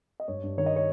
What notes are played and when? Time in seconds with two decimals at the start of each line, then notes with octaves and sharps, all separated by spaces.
0.20 D#5
0.28 G2 C#5
0.43 G2
0.57 D#3 C#5
0.66 D#5
0.76 C#5